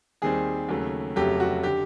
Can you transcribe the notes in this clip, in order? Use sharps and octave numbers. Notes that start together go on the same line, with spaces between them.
D#2 D#3 G3 C4 G#4
D#2 C#3 F#3 A3
F1 F2 C#3 F#3 A3 G4
F#4
D3 G4